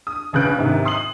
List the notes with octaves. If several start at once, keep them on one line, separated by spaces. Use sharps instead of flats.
D#6
A#1 C#3 B4 F#6 D7
G#2 C3 D#3
C6 D#6 C7 F#7